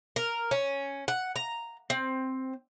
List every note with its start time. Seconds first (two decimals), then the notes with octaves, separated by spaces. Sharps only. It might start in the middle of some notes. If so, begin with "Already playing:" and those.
0.16 A#4
0.51 C#4
1.08 F#5
1.36 A#5
1.90 C4